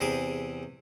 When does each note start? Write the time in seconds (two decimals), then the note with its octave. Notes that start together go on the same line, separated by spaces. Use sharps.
0.01 E2 C3 G#4 D6